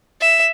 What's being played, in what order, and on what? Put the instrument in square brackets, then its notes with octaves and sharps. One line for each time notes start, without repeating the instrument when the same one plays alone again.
[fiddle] E5